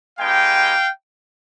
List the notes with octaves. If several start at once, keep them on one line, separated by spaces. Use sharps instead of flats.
G#3 B3 D#4 G4 F5 G5